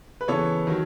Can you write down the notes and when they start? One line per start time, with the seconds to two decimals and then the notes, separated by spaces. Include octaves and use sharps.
0.21 B4
0.28 C#3 E3 B3 A4 C#5
0.67 D#3 F#3